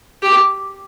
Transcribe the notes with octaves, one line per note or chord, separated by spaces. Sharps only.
G4